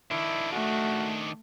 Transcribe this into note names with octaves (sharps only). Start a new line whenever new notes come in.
D#3 D4 E4
A3 F#4